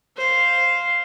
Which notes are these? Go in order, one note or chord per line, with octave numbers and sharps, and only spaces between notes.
C5 F5